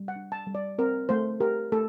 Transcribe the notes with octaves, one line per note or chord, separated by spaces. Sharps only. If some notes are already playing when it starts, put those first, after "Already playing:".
Already playing: G3
F#5
D4
A5
G3
D5
C4 A#4
A3 C5
G4 A#4
A3 A4